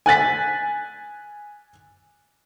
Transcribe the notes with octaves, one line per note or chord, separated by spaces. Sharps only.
G#5 F#6 A6 B6